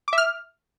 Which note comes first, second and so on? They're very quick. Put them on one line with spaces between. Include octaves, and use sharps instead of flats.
D6 E5 F6